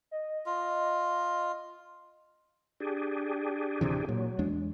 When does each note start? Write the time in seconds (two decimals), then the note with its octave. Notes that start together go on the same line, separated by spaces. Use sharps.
0.11 D#5
0.46 F4 D#5
2.80 D4 G4 G#4
3.81 D1 C3 E3
4.09 A#2 F#3
4.39 E2 G#3 D4